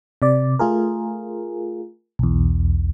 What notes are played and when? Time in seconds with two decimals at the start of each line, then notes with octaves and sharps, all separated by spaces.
0.22 C3 D5
0.59 A3 F4 G#4 A#4
2.19 B1 E2